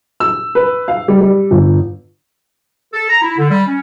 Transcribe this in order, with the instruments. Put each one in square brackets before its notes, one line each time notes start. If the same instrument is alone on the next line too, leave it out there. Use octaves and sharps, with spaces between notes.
[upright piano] E6
B4
F5
G3
G3
G1
[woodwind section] A4
A#5
E4
D3
G3
C#4